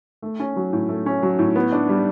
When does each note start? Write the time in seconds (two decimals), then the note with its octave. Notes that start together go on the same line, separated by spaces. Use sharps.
0.22 A3
0.40 C#4
0.56 F#3
0.73 A2
0.89 A3
1.06 C#4
1.23 F#3
1.39 A2
1.55 B3
1.73 D4
1.89 G3